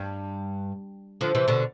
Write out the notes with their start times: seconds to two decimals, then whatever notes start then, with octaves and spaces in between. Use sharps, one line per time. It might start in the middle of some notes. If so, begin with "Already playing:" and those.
Already playing: G2
1.21 D3 F3
1.35 C3 E3
1.48 B2 D3